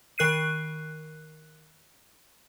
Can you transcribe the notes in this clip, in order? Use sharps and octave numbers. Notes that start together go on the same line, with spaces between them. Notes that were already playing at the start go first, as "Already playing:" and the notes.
D#3 A#4 F#6 C7 D#7